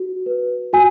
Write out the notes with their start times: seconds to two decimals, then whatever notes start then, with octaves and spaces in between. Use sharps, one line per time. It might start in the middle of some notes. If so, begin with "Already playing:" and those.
Already playing: F#4
0.26 B4
0.73 F#4 G#5